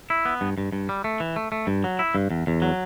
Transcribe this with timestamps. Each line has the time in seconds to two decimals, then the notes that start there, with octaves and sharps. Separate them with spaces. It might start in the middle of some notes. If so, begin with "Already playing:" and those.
0.10 E4
0.25 B3
0.41 G2
0.58 G2
0.72 G2
0.89 G3
1.04 A3
1.20 E3
1.36 A3
1.52 A3
1.67 G2
1.84 F#3
1.99 E4
2.15 G2
2.30 E2
2.47 E2
2.62 F#3